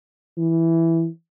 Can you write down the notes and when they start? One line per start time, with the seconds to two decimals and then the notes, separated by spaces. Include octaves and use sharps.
0.37 E3